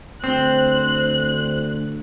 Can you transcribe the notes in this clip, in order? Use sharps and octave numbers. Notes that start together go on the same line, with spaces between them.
D2 C4 C5 F#6